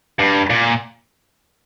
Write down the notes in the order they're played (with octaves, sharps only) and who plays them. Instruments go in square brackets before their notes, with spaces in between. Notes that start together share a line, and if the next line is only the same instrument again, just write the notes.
[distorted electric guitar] G2
A#2